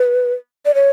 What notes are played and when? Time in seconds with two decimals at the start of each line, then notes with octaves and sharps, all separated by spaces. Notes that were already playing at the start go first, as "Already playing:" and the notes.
Already playing: B4
0.65 D5
0.75 C#5